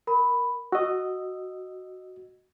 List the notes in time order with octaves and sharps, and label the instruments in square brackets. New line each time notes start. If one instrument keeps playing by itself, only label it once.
[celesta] A#4 B5
[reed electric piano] F#4 D#5 [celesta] E6